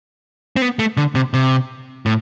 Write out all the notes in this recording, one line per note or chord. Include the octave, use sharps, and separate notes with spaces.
C4
B3
A3
D3
C3
C3
A2